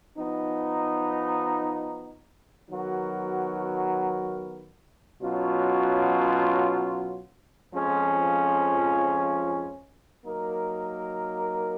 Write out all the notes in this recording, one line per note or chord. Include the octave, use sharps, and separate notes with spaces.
F3 B3 D#4
D#3 F#3 B3 F#4 A#4
B2 F#3 C#4 F4
F2 F3 G#3 C#4 F4
F#3 A#3 D#4 A#4